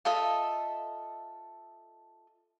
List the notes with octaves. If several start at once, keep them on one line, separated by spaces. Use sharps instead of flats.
F4 A4 D#5 E5